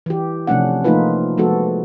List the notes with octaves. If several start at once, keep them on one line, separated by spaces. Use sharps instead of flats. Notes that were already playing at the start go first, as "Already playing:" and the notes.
E3 G4
C3 F3 A3 C#4 D4 F#5
F3 A3 A#3 D#4 F4 B4
F3 G#3 A3 B3 F#4 A4